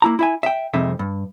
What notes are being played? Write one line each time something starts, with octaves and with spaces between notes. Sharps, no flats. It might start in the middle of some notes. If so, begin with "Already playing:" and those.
A#3 E4 A#5
E4 E5 G#5
E5 G5
C2 F2 C3 G#3 D#4 E5
G2